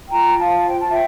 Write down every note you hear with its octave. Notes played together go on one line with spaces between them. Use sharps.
F4 G5 A#5
F4 F5 A5
C5 G5
A5
E5 G5